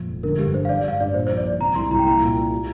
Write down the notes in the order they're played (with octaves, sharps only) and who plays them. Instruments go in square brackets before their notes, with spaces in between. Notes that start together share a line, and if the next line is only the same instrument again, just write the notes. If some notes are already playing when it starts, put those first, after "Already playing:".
Already playing: [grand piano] F2 A#2
F1
[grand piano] D3 [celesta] A#4
[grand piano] G2 [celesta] G4
[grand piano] D4 [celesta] C5
[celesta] F5
[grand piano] G3 [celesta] D5
[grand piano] G2 [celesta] F5
[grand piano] G2 [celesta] D5
[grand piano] A#2 [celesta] C5
[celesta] C5
[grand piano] A#1
[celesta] D5
[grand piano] A#1
[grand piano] C3 [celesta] A#5
[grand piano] C2 [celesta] C6
[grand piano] C2 [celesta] A#5
[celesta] G5
[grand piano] A#3 [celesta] A#5
[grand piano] A#2
F4
G3